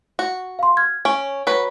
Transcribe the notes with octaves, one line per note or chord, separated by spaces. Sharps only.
F#4
F5 C6
F6 G#6
C#4 D7
F#3 B4